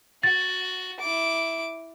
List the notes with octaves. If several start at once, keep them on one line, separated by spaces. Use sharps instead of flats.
F#4 A6
E4 D6